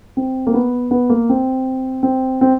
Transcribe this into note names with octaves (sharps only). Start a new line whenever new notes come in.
C4
A#3
B3
B3
A#3
C4
C4
C4